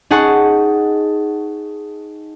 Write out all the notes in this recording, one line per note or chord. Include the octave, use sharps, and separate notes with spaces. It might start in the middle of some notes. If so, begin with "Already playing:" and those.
D#4 G#4 F#5 A5 C#6